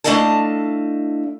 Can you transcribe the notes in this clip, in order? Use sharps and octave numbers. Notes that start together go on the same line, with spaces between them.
A3 D4 E4 D#5 F5 A5